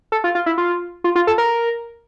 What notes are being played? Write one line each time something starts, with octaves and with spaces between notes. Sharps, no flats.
A4
F4
F4
E4
F4
F4
F4
A4
A#4